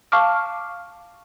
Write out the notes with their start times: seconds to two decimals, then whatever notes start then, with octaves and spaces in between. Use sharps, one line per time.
0.12 F5 A5 C#6 D6 F6